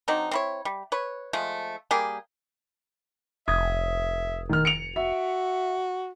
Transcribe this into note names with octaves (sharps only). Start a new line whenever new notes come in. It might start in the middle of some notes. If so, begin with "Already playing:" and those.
F#3 C4 D4 D#4
C4 E4 C#5
G3
B4 C#5
F3 G#3 A3
G3 A#3 G4 G#4
F1 E5 D#6 G#6
D#3 F6
C#7 D7 F7
F#4 E5